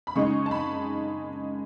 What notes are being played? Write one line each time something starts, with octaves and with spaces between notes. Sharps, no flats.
B5
C#3 G#3 D#4 C#6
A5
B5